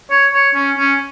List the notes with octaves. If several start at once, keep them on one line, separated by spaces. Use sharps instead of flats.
C#5
C#5
C#4
C#4